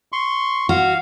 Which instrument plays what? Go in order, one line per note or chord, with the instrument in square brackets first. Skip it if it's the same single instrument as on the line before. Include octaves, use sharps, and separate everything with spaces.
[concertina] C6 C#6
[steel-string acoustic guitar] F#4 [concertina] F5